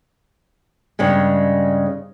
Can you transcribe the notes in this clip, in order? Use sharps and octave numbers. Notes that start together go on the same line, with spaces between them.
G2 C#3 G3 G#3